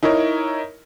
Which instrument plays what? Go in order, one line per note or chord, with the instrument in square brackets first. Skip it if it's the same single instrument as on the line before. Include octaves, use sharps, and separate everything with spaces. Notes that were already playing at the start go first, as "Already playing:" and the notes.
[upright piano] D#4 E4 A#4 C#5